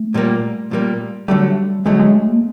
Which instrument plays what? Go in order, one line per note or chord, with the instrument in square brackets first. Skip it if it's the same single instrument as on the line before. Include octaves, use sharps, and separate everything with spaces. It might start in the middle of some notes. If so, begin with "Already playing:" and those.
Already playing: [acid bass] A3
[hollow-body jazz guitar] A#2 G3 A#3
A#2 G3 A#3
[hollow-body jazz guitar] D3 F#3 A3 [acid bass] G3
[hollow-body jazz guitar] D3 F#3 A3 [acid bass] G#3
[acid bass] G#3
A3
A#3